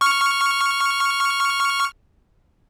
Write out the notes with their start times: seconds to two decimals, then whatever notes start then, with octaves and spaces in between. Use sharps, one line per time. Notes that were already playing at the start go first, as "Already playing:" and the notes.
0.01 C#6 F6